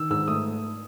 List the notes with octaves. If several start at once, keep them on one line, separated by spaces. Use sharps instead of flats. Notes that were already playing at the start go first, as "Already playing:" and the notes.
Already playing: D#3 E6
G#2 E6
A3 D#6